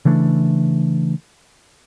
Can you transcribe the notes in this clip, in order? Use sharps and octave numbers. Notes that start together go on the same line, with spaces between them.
C#3 E3 A3 D4